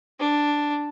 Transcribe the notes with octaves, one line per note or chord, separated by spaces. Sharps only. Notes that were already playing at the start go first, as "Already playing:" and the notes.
D4